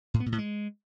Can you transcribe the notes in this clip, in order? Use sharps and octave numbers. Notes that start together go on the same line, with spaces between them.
A2
B3
A#2
A2
G#3